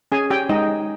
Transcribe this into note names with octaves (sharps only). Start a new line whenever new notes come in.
C#4 G#4 G#5
C#4 G4 G5
G#3 D#4 D#5
G#3